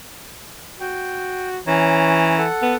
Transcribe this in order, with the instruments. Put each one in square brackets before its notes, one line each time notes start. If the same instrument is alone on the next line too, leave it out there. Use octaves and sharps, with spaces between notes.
[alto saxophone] F#4 [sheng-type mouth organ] G5
[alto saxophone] E3 [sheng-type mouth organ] C#4 C#5 A#5
[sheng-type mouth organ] A4 F#5
[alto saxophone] B3